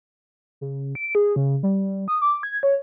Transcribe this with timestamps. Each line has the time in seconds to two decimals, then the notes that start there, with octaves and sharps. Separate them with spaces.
0.61 C#3
0.95 D7
1.15 G#4
1.36 C#3
1.63 G3
2.08 D#6
2.22 D6
2.43 G#6
2.63 C#5